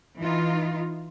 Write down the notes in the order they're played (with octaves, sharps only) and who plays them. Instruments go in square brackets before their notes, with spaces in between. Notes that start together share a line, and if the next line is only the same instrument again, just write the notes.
[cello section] E3 D#4 F4